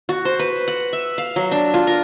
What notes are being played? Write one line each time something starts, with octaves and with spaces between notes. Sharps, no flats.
F#4
C5
B4
F#5
E5
F5
F#3
D4
F4
A#4